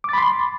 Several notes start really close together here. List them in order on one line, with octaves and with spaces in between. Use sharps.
D6 A6 B5 C6